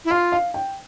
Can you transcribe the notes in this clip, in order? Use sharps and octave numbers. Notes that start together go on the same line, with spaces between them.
E4
F4 F5
F5
G5